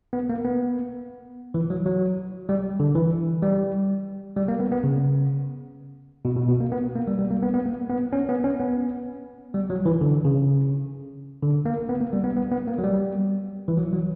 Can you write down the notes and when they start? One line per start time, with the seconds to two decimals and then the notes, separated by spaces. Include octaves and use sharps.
0.13 B3
0.29 A#3
0.45 B3
1.54 E3
1.70 F#3
1.86 F#3
2.49 G3
2.80 D3
2.95 E3
3.43 G3
4.36 G3
4.48 A#3
4.60 B3
4.72 B3
4.84 C#3
6.25 B2
6.36 B2
6.48 B2
6.60 A#3
6.72 B3
6.96 A#3
7.07 G3
7.19 G3
7.31 A#3
7.43 B3
7.54 B3
7.66 A#3
7.90 B3
8.13 C#4
8.29 B3
8.44 C#4
8.60 B3
9.54 G3
9.70 F#3
9.86 E3
10.01 D3
10.25 C#3
11.43 D3
11.65 A#3
11.89 B3
12.01 A#3
12.13 G3
12.24 B3
12.36 B3
12.51 B3
12.68 A#3
12.78 F#3
12.83 G3
13.68 E3
13.77 F#3
13.93 F#3